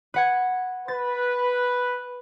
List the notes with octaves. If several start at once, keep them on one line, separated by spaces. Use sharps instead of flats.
B4 F#5 G#6
B4 A6